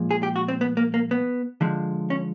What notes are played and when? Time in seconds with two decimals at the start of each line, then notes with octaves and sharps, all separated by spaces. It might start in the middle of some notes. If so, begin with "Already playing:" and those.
Already playing: A#2 F3 G#3
0.11 G#4
0.23 G4
0.36 F#4
0.48 C4
0.61 B3
0.77 A#3
0.94 A#3
1.11 B3
1.61 D3 F3 G#3
2.10 C#4